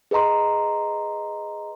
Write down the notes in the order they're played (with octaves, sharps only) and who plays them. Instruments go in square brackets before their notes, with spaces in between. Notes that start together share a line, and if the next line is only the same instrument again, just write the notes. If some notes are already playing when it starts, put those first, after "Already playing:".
[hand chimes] G#4 B4 D#5 A#5 C6